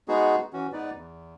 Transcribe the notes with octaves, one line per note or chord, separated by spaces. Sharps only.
G#3 B3 D#4 F#4 G#4
E3 C#4 F#4
G#2 B3 D#4 B4 D5
E2